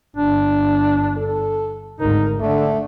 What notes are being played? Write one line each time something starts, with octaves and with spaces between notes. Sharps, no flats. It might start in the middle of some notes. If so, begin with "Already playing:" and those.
G1 D4
A4
G#1 D2 D#4 A#4
D3 A3 D4